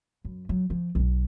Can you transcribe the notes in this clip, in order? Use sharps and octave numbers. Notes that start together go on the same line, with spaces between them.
F#2
F#3
F3
B1 B2